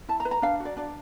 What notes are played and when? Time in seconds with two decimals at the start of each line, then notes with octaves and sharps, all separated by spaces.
0.08 E4 A5
0.20 A#5
0.25 B4
0.31 A#5
0.42 D4 F5
0.60 F#4
0.65 D5
0.77 D4 D5